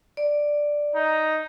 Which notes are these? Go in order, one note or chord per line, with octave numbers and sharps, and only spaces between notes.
D5
D#4